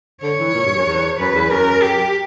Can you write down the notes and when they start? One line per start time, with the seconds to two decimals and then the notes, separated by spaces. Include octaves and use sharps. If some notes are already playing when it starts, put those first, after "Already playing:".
0.23 D3 C#5
0.39 E3
0.55 A#2
0.66 G2
0.76 F#2
0.86 E2
1.19 F#2 B4
1.35 E2
1.50 F#2 A#4
1.82 G4